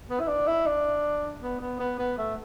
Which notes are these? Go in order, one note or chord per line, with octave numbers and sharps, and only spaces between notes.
B3
E4
D4
E4
D4
B3
B3
B3
B3
A3